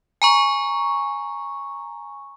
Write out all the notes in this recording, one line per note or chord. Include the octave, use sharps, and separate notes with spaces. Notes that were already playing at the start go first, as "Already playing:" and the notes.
G#5 A#5 C#6